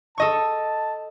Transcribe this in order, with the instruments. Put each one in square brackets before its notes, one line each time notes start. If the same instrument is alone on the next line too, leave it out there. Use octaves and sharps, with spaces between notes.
[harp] A4 D#5 C#6 [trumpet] A5